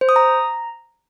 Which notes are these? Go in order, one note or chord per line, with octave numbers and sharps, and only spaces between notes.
C5
D#6
A#5